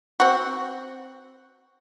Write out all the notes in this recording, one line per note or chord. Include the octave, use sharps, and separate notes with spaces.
C4 F#4